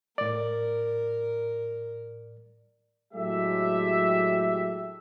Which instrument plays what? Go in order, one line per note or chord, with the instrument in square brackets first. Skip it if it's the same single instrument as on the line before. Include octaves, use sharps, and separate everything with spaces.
[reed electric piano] A2 D5 [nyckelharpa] A#4
[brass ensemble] A2 F#3 G#3 G4 A4 E5